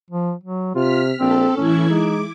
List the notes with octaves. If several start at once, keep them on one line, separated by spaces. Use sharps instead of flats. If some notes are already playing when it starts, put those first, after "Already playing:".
F3
F#3
C3 F4 F6 B6
A#1 C4 A4
A2 E3 C#4 E4 G#6
G#3 D#4 D6